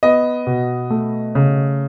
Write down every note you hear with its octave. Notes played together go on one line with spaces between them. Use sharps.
B3 D#5
B2
A3
C#3